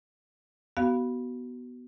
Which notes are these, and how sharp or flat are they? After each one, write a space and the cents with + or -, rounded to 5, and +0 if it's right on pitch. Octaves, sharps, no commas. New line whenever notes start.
B3 +0 F#4 +30 F5 +0